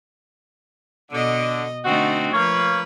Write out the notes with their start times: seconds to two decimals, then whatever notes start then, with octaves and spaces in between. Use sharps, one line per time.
1.12 B2 D3 D#5
1.85 D3 A3 C4 D#4 F#4
2.33 F3 A#3 B4 C#5